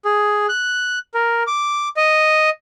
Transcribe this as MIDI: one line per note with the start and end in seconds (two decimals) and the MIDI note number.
0.05 0.46 68
0.49 0.99 90
1.14 1.43 70
1.47 1.89 86
1.97 2.50 75